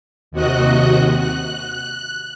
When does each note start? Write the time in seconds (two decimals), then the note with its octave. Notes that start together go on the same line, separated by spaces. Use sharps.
0.32 D#2 C3 F#4 D#5 F#6
1.18 F#6